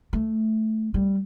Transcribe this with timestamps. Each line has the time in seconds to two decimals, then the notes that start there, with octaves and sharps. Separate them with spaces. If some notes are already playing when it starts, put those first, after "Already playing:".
0.13 A3
0.94 G3